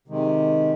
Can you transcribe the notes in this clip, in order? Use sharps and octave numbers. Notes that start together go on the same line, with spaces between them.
C3 D#3 G#3